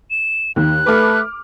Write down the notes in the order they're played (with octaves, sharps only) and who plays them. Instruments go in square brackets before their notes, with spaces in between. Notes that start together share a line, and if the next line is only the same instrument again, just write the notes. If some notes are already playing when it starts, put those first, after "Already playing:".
[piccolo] E7
[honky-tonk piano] D#2 [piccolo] F#6
[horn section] A3 B4 [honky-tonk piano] D6 F6